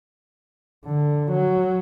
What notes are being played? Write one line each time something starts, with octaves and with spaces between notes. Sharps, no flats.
D3
F#3